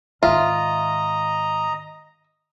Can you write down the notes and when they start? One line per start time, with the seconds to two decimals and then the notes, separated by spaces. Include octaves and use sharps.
0.23 G#2 D#3 F4 D#5 E5 A#5